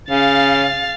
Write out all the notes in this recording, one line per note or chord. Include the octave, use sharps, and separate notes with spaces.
C#3 F5 A6